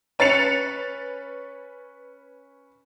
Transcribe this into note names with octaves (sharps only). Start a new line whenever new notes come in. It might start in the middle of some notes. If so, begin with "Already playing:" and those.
C#4 B4 A6 C7 C#7 F7